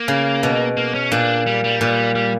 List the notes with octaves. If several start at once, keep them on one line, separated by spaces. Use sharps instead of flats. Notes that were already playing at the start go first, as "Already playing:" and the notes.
Already playing: A#3
C#3
B2
A#3
C#4
A#2 D4
G3
G3
A#2
G3